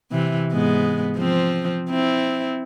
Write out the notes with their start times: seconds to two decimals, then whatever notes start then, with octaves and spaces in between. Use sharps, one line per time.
0.11 C3 E3
0.53 G#2 G#3 B3
1.17 F3 C4
1.90 C4 E4